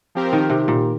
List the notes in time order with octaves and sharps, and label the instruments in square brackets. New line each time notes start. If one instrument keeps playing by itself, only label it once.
[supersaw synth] F3 C4 G4 A#4
[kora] D#3
C3
A#2